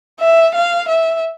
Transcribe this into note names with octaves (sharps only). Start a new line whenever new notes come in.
E5
F5
E5